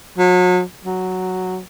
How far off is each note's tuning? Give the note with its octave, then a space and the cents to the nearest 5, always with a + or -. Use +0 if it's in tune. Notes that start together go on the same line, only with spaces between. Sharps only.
F#3 -35
F#3 +0